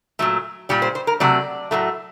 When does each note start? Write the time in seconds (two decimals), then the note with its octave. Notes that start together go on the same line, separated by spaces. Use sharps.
0.19 A#2 F#3 A3
0.69 A#2 G3 D5
0.82 C5
0.95 C5
1.07 A#4
1.20 C3 F#3 A3 D5
1.71 A2 F#3 A3